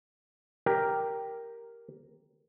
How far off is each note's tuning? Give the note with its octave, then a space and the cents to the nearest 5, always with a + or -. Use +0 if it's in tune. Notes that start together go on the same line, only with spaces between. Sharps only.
G4 +0 A#4 +0